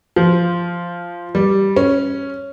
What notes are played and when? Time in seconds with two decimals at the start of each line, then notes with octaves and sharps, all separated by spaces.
0.16 F3
1.35 G3
1.76 C#4